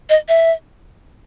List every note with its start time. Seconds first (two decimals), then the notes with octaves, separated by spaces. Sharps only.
0.10 D#5
0.29 E5